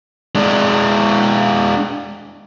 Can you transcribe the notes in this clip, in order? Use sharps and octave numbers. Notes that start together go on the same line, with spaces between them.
G#3 D4